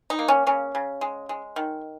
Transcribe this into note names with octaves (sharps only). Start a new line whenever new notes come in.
D#4
A#3
C#4
C#3 C#4
C#3
G#3
G#3
D#3